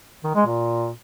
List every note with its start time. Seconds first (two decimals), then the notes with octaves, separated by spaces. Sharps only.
0.24 D#3
0.35 G#3
0.47 A#2